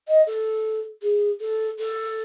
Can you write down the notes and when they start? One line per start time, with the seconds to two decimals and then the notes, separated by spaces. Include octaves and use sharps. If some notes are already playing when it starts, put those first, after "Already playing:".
0.08 D#5
0.27 A4
1.02 G#4
1.40 A4
1.79 A4